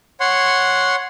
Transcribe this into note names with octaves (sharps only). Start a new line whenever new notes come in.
C#5 F#5 C6